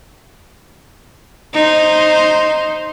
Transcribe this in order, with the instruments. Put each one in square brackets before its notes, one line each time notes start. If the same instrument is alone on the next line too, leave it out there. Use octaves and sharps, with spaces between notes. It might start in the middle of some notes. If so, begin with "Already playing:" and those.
[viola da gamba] D#4 C5